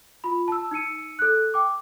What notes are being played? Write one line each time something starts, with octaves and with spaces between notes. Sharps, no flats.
F4 B5
A5 E6
D#4 E6 C#7 D#7
A4 F#6
G5 D6